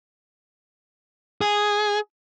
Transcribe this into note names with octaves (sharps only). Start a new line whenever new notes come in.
G#4